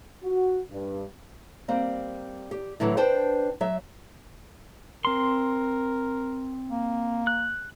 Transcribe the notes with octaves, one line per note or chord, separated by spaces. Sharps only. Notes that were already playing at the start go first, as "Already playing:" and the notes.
F#4
G2
G3 A#3 C4
G4
A2 D3 E3 F#3
D4 B4 C5 G5
F#3 E5
C4 A#4 C6
A#3
F#6